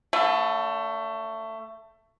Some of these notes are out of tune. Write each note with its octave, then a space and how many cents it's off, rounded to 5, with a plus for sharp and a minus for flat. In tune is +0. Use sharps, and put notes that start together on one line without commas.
D3 -30 A3 +20